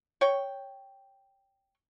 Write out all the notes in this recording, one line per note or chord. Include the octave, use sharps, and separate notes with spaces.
C#5 G5